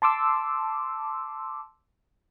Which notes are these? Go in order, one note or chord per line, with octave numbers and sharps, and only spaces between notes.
A5 C6 D6 E6